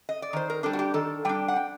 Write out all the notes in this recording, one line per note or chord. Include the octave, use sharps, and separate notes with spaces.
D#5
D5
D#3 C5
A#4
G3 D4 A4
F#4
G4
D#3 A4
G3 D4 G5
F#5
G5